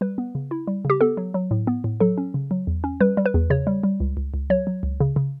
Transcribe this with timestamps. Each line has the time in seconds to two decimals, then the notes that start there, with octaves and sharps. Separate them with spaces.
0.01 G3 B4
0.18 B3
0.35 C#3
0.51 E4
0.67 G3
0.85 C#3 G4
1.01 B3 A4
1.17 F#3
1.34 F#3
1.51 A2
1.67 B3
1.84 A2
2.00 F#3 A4
2.18 C#4
2.34 C#3
2.51 F#3
2.67 E2
2.84 C#4
3.01 G3 B4
3.17 G3
3.26 B4
3.34 E2
3.50 C#3 C#5
3.67 G3
3.83 G3
4.00 C#2
4.17 C#2
4.34 C#2
4.50 F#3 C#5
4.67 F#3
4.83 C#2
5.00 C#3
5.16 C#3